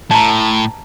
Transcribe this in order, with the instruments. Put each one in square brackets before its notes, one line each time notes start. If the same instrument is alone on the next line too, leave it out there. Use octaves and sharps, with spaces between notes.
[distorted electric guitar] A2 [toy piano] A5 A#5